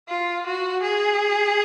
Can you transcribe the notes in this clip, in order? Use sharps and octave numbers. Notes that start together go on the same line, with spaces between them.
F4
F#4
G#4